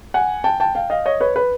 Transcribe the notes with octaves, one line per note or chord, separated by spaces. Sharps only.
F#5 G#5
G5 A5
G5 A5
F5 G5
D#5 F5
C#5 D#5
B4 C#5
B4